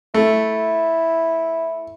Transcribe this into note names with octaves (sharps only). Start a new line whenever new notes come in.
A3 E4